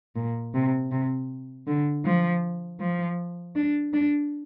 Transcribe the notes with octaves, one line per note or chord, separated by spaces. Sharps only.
A#2
C3
C3
D3
F3
F3
D4
D4